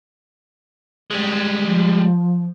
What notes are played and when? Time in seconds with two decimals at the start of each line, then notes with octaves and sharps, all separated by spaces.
1.11 G3 G#3
1.64 F3